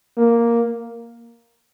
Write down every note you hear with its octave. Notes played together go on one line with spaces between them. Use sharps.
A#3